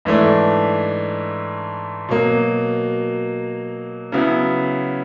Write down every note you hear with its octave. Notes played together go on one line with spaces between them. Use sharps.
G#2 E3 A3 D4
B2 F#3 A#3
C#3 F#3 B3 E4